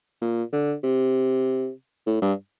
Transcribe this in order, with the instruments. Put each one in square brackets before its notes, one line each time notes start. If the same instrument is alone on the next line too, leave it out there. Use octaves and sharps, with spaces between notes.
[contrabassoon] A#2
D3
C3
A2
G2